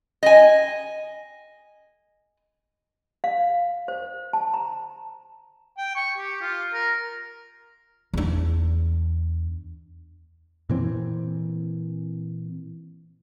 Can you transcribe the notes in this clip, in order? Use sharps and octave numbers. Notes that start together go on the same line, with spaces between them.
D#5 G#5
F5
C5
A5
A#5
G5
C#6
G4
F4
A#4
E2 D4
A#2 E3 C4